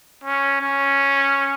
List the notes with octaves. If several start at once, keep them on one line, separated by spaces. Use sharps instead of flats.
C#4
C#4